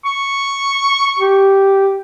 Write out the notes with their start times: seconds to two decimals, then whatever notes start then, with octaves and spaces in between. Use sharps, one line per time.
0.05 C#6
1.19 G4